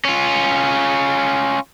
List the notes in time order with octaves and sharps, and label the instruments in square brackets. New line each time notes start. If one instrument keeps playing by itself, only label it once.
[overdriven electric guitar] C#4 F4